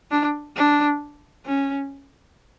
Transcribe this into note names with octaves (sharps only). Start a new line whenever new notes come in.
D4
D4
C#4